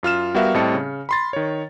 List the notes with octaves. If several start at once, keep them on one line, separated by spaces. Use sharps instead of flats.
F#2 F4 F6 E7
G3 B3 F#4 A#4 E5 F5
A2 G3 C4 D#5 A5 C#7
C#3
B5 C6 A6
D#3 C#5